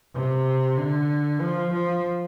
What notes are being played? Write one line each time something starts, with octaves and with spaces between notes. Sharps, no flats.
C3
D3
F3
F3